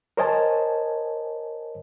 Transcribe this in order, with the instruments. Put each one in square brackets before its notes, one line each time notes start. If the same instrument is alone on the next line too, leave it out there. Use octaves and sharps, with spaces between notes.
[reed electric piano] A#4 C5 C#5 D#5 G#5 A5